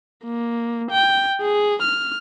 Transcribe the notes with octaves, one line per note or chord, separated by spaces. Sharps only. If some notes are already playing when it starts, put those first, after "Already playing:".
A#3
G5
G#4
F6